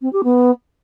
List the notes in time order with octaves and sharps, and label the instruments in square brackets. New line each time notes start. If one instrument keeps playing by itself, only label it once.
[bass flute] C4
G4
B3